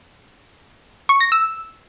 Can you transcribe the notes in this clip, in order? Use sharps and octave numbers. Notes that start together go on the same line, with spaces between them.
C#6
A#6
E6